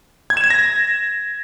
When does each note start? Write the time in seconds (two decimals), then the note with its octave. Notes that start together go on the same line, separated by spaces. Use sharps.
0.30 G#6
0.37 E7
0.44 G#6
0.50 A#6